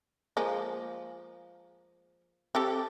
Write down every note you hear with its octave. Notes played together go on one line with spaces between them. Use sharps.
F3 G#3 A#3
C4 G4 A4